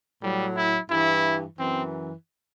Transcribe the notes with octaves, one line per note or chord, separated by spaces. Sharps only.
A2 F#3 G3
E4
G2 E3 E4
F#2 E3 C4